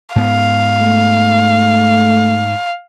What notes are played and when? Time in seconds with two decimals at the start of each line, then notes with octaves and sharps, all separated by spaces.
0.16 G#2 B3 F5
0.81 A3